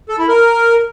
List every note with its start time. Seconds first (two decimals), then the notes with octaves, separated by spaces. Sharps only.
0.09 A4
0.19 E4
0.28 A#4